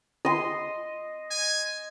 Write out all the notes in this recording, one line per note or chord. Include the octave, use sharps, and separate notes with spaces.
D#5 C6
G#5